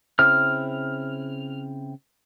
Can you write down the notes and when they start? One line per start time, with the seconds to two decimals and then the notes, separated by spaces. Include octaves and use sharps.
0.19 C#3 C4 E4 F6